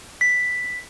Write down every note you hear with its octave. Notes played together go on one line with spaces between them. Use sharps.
B6